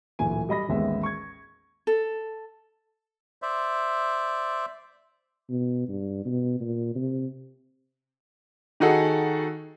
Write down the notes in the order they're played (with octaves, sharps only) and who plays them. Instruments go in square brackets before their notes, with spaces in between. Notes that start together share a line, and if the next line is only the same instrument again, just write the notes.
[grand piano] D1 A#2 E3 G#5
G3 D#5 B5 A#6
A1 D#2 G#3 B3 E5
C#6 G#6
[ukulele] A4
[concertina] C5 D5 E5
[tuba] B2
G2
B2
A#2
C3
[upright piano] D#3 D#4 F#4 G#4 A4